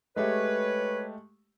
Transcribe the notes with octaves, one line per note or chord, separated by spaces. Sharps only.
G#3 A3 G4 B4 C#5